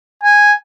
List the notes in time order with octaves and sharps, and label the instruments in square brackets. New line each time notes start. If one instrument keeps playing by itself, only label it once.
[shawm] G#5